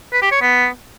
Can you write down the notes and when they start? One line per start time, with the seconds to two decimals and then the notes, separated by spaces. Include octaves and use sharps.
0.12 B4
0.22 G4
0.32 C#5
0.41 B3